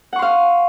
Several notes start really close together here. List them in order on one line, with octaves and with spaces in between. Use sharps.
F#5 C#6 C6 F5